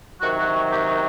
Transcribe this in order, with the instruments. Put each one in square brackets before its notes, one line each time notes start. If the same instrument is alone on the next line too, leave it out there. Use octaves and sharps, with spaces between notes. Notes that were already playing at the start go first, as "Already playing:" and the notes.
[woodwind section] C3 D#3 F#3 F#4
F#4
F#4
G4
D#4